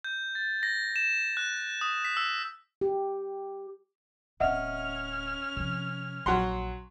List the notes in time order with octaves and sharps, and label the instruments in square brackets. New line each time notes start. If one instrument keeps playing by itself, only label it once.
[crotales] G6
A6
A#6
E7
F#6
D#6
B6
E6
[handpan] G4
[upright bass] D1 [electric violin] C#4 F6 [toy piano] D#5 E5 F#5
[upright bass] C3 F3
[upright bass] A#1 [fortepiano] F#3 F#5 C6 [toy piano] G#5 C#6